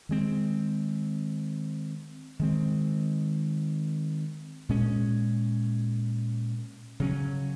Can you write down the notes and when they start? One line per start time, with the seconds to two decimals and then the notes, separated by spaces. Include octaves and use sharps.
0.09 D#3 G#3 C4
2.39 D#3 G#3 C4
4.69 A#2 G#3 C#4
7.00 C#3 F#3 C#4